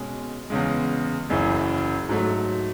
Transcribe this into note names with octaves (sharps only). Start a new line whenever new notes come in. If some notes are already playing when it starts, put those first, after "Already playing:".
Already playing: B2 G#3 C#4
E2 C#3 G#3
F#1 F#2 C#3 E3
G#2 F#3 A3